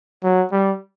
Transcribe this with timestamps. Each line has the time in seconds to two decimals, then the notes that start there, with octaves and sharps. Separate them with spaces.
0.23 F#3
0.52 G3